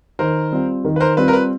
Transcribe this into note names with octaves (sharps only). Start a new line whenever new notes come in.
D#3 A#4 C5
G3 C4 F4
D#3
B4
A#4 C5
G3 C4 F4 B4
A#4
B4